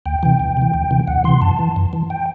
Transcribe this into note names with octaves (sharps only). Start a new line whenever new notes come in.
D2 G5
C3 E3 G5
D2
C3 E3
D2
C3 E3
D2 F#5
C3 E3 C6
F#2 A5
E3
F#2
E3
G5